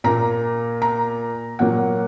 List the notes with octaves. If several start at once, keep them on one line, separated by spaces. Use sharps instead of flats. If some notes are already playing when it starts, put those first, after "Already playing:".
A#2 A#3 A#5
A#5
A#2 F#3 A#3 F#5